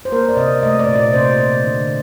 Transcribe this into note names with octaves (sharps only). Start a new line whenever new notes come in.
C5
A#3 A#4
D5
C3 D#5
A3 D#5
D5
A#2
D5
C3 C5
C3
D3